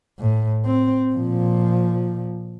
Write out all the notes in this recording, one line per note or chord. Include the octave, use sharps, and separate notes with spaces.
A2
C4
A#2 F3